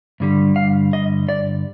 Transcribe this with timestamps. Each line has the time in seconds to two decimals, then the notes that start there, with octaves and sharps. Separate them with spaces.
0.20 G2 D3 G3
0.56 F5
0.93 D#5
1.29 D5